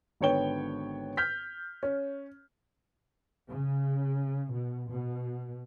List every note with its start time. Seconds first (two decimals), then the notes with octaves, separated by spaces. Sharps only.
0.21 G#1 D3 B3 C#5 G5 G7
1.17 F6 G6 B6
1.83 C#4
3.50 C#3
4.53 B2
4.91 B2